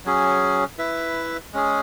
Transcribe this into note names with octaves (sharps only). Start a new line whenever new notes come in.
F#3 C#4 G#4
E4 B4 E5
G#3 C#4 G#4